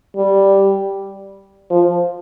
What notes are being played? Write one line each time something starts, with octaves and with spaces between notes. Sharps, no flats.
G3
F3